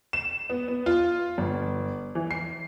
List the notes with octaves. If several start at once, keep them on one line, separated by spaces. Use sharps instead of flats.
E7
B3
B3
F4
G1
E3
C7